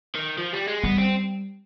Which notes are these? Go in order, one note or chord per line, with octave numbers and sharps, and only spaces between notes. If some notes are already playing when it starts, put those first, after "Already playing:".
D#3
F3
G3
G#3
G3 B3
C4